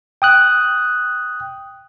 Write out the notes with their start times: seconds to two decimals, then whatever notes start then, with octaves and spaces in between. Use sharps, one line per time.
0.22 G5 D#6 F#6